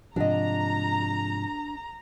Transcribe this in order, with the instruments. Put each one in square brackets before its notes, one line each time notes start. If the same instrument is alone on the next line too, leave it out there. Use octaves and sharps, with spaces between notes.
[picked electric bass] G#2 C3 F3 [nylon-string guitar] D4 D#5 [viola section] A#5